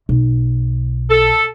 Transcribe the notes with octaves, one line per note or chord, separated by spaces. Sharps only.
B1
A4